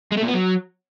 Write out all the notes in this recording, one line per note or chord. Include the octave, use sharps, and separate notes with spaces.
G#3
A3
A#2
B3
F#3